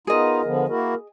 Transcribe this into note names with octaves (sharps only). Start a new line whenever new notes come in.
B3 D#4 F4 G#4 A#4 D#5
D3 F3 B3
A#3 E4 F#4 A#4